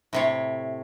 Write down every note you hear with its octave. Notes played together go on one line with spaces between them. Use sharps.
A2 C3 C#5